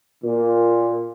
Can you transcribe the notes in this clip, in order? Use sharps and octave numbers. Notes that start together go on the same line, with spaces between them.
A#2